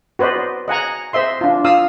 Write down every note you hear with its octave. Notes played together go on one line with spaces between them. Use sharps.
F#4 B4 C5 D5 D#5
D#5 F#5 G#5 A#5
C5 D#5 E5 C6
D4 F4
F4 F5 D#6 E6